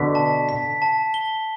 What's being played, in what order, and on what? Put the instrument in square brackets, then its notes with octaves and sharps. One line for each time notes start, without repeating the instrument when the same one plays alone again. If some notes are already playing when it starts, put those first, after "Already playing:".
Already playing: [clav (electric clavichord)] B2 D3 [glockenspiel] B6
[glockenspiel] A5
B6
A5
G7